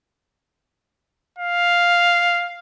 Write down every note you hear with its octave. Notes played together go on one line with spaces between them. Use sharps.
F5